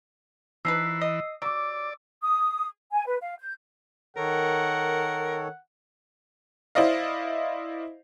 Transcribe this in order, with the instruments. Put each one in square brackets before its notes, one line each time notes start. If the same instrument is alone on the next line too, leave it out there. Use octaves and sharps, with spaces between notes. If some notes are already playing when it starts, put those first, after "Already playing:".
[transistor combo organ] E3 [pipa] F3 D#4 B4 [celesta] E6 C7
[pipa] D#5
[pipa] F#3 [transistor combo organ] D5 [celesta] D6 E6
[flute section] D#6
G#5
B4
F5
G6
[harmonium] D#3 A4 C#5 [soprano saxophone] A#4 [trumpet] F#5
[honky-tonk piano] E4 C5 D5 D#5 F5